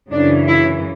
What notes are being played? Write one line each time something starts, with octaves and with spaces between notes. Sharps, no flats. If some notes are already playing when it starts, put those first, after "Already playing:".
F#2 C#3 E3 D4
E4